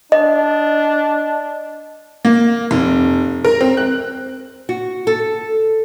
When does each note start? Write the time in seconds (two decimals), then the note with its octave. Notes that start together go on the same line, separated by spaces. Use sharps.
0.12 D4 D#5
2.25 A#3
2.71 F1
3.45 A#4
3.61 C4
3.77 F#6
4.69 F#4
5.07 A4